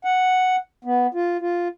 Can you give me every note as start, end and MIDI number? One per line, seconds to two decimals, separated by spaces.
0.05 0.56 78
0.85 1.07 59
1.14 1.37 65
1.41 1.68 65